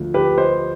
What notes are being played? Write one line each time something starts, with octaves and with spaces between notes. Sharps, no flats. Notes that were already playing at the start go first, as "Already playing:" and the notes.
Already playing: D2 D3 F3
G4 B4
C5 D#5